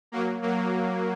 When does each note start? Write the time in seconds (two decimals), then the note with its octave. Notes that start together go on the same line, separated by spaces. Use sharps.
0.12 F#3 A#3
0.42 F#3 A#3